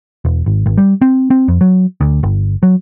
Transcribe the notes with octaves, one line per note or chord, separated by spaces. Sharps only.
E1
G#1
G#1
G3
C4
C4
F2
F#3
D2
G1
F#3